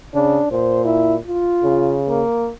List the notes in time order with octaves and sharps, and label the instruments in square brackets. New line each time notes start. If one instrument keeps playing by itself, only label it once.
[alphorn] C#3 [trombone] D4
[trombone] A#2 [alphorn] C5
[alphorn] E4
F4
[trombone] C#3
[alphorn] A#3